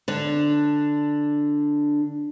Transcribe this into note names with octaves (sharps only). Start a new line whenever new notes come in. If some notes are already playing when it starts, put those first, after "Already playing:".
D3 D4